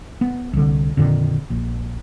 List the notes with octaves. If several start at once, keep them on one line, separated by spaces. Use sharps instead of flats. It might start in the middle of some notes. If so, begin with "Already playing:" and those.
B3
C2 D3
F2 A#2 D3 D#3
A#1